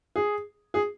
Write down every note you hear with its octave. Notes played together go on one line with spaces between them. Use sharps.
G#4
G#4